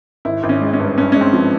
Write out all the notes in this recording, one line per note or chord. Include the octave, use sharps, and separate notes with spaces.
G#1 E4
G#1
C#4
G#3
C#4
G2
G2 C#4
G#3 C#4
C4
F3